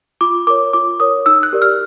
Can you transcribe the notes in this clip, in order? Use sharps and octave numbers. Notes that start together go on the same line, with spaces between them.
F4 D6
A#4 C#5 D6
F4 D6
A#4 C#5 D#6
D#4 E6
F#6
G4 A#4 D5
F6